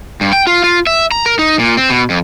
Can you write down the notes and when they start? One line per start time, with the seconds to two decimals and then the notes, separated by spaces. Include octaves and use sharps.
0.21 G2
0.33 G5
0.47 F4
0.64 F4
0.87 E5
1.11 A#5
1.26 A#4
1.39 D#4
1.59 A#2
1.77 C4
1.90 B2
2.10 F2